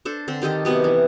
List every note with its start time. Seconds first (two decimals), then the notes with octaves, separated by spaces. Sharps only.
0.05 D4 A4 C5
0.28 D3 C4
0.42 D#3 G4 A4 D#5
0.65 C3 F#3 B3 G4
0.84 E3